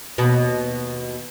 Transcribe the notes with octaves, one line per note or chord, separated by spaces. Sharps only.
D#2 B2